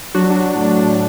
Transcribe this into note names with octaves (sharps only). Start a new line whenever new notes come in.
F#3 D4 F#4
D4 F#4
F#3
D4
A2
D4
A2 D4